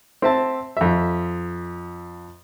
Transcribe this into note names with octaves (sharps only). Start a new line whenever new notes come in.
C4 E5 A5
F2 E5